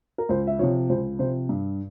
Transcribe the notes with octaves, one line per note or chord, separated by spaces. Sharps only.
A#4
C#2 C5
E5
C3 F3 C#5
C#2 C5
C3 F3 C5
G2